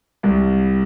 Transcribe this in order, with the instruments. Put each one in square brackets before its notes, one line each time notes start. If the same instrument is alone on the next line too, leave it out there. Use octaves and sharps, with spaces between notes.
[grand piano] C2